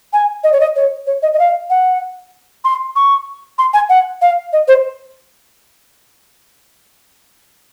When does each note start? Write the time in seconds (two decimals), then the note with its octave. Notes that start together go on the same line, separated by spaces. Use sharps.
0.13 G#5
0.44 D#5
0.52 C#5
0.60 D#5
0.76 C#5
1.07 C#5
1.22 D#5
1.34 D#5
1.39 F5
1.70 F#5
2.64 C6
2.96 C#6
3.58 C6
3.74 G#5
3.89 F#5
4.22 F5
4.53 D#5
4.68 C5